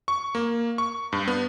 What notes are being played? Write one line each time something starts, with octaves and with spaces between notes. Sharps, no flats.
C#6
A#3
C#6
G2
B3